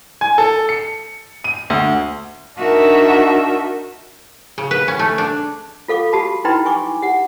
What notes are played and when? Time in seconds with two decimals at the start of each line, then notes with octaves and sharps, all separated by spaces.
0.21 G#5
0.38 A4
0.69 C#7
1.44 D#7
1.70 D2
2.56 D4 D#4 F#4 A#4 E5 A5
4.58 C#3
4.71 B4
4.88 C#4
4.99 A3
5.18 D4
5.88 F4 A4 F5 D6
6.13 F#4 G4 A5 B5
6.45 D#4 E4 B4 G5 B5 C6
6.66 G#5 C#6 D6
7.02 G4 F#5